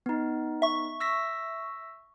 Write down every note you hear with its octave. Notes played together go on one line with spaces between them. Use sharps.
B3 D#4
E5 C#6
E6 A#6 B6